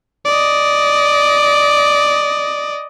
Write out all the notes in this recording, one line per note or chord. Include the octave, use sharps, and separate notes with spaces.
D5 D#5